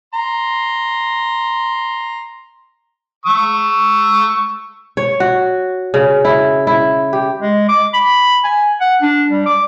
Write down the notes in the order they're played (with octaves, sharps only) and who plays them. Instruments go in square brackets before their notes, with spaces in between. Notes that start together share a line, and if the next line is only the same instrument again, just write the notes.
[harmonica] A#5 C6
C#6 E6
[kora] C#5
F#4
C#3
E4
E4
G4
[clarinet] G#3
D6
B5
G#5
F#5
D4
G3
D6